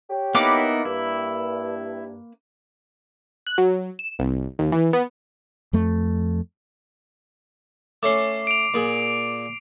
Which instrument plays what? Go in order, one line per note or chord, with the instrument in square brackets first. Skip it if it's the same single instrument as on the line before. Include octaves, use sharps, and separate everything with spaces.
[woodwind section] G4 C#5
[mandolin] A#3 B4 D6 [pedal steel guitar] B3 D#4 E4
[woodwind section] G2 [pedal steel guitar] E4
[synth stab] F#6
F#3
E7
C2
D#2
E3
B3
[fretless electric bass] F2 A3
[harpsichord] A3 C#4 A4 [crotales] D6 C7
[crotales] D7 F7
[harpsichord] A#2 G#4